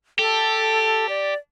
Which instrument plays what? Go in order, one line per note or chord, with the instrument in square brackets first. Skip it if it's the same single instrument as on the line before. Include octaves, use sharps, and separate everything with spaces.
[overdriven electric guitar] G4 [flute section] A4
[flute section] D5